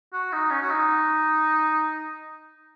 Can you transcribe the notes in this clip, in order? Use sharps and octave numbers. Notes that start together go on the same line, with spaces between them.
F#4
D#4
C#4
F#4
D#4